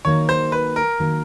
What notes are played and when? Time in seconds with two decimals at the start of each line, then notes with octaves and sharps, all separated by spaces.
0.05 D#3 F#3 A#3 D#4 C#5
0.29 C5
0.52 B4
0.76 A#4
1.00 D#3 F#3 A#3 D#4